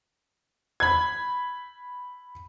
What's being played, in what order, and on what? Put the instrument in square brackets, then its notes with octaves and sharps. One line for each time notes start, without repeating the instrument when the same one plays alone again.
[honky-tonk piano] B5 G#6